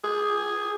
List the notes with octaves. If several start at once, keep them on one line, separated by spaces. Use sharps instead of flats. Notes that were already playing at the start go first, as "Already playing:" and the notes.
G#4